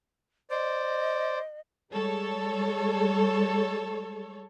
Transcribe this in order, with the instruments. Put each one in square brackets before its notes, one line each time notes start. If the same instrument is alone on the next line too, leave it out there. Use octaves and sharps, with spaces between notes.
[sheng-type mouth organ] C5 D5 [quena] D#5
[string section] G3 G#3 A4 C#5